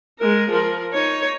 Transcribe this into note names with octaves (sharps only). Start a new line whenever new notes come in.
G#3 A#4
F3 A#4
D#4 C#5